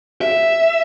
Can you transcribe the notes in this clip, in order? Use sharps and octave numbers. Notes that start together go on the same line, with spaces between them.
E5